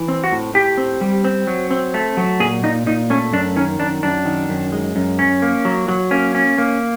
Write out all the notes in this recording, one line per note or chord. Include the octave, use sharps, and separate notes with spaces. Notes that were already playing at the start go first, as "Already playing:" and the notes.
Already playing: E3
C4
F#4
A2
A2 G4
C4
G3
C4
F#3
C4
A3
F#3
A#2 G#4
A#2 D#4
A#2 D#4
A3 C#4
F#2 D4
D#3 C#4
F#2 D4
F#2 D4
D#3
F#2
G#3
F#2
C#4
A#3
F#3
F#3
A#3 C#4
C#4
A#3